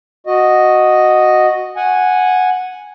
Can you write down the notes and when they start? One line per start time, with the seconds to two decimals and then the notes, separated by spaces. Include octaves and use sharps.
0.27 F#4 D#5
1.77 F#5 G#5